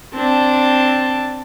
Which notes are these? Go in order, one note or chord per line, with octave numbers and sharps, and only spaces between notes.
C4 D4 A5